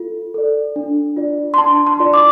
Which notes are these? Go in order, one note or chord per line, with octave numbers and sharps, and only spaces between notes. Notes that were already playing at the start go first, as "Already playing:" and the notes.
Already playing: F4 A4
A4 D5
D4
F4 D5
C6
D4 A5
C6
F4 D5
D6